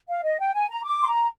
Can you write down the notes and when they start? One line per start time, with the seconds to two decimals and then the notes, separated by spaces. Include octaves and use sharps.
0.09 F5
0.24 D#5
0.39 G5
0.54 G#5
0.69 A#5
0.84 D6
1.02 C6
1.07 A#5